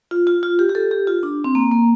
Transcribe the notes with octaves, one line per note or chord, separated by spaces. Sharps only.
F4
F4
F4
G4
G4
A4
G4
F4
D4
C4
A#3
A#3